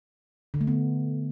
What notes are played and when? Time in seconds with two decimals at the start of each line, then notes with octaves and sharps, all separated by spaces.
0.54 D3
0.61 A3
0.67 B3